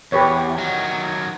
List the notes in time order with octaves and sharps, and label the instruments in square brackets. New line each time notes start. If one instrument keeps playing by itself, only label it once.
[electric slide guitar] E2 [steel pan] G4 B4 C#5
[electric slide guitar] D#3 F#3